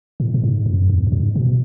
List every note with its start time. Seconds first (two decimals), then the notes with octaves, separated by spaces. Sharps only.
0.20 A2
0.34 A2
0.44 G#2
0.66 F#2
0.90 E2
1.07 F#2
1.12 G#2
1.36 B2